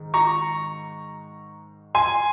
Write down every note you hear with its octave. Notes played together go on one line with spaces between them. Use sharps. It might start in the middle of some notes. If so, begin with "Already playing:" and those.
Already playing: G#2 D#3
A#5 C#6
G#5 C6